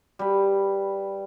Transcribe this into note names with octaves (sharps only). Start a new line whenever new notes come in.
G3 B4